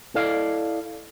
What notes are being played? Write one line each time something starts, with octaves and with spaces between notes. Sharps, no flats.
E4 A4 D5 D#5 F5